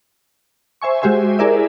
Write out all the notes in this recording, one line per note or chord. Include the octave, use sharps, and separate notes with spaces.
C5 E5 G#5 C#6
G#3 F#4 G4 C5 E5 G#5
E4 G#4 A#4 D5 E5